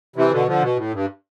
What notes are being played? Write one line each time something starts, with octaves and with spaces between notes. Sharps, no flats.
C3 E3
B2 D3
D3 F3
B2
A2
G2